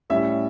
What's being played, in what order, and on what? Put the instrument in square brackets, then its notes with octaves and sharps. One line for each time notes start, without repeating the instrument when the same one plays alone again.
[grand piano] A2 G3 C#4 E5